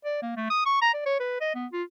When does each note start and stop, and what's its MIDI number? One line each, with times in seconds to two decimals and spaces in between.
0.05 0.19 74
0.22 0.36 58
0.37 0.50 57
0.50 0.66 87
0.66 0.78 85
0.82 0.91 82
0.94 1.02 74
1.06 1.15 73
1.20 1.40 71
1.41 1.53 75
1.55 1.66 59
1.73 1.83 65